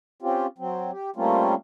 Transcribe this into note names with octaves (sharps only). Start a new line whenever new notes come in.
C4 C#4 F4 G4
F#3 C4
G4
G3 A3 A#3 C4 C#4 F4